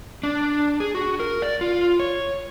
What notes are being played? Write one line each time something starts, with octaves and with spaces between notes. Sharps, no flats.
D4
G#4
F#4
A#4
D5
F4
C#5